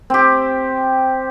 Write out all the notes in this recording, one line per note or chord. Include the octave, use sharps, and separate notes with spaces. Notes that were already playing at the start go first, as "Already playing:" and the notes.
C4 G4